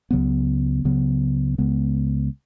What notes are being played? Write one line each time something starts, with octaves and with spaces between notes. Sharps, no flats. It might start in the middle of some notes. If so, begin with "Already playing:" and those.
C#2 C#3 F#3 B3
C#2 C#3 F#3 B3
C#2 C#3 G#3 B3